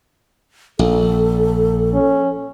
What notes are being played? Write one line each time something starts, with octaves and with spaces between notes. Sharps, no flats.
A#1 A4
C#4